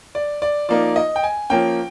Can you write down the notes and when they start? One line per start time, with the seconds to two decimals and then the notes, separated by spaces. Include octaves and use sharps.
0.15 D5
0.42 D5
0.69 F3 A#3 D#4 D5
0.96 D#5
1.16 G5
1.23 G#5
1.50 F3 A#3 C#4 G5